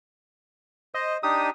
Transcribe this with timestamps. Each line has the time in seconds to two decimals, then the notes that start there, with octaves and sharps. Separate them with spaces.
0.94 C5 D#5
1.23 D4 D#4 G4 D#6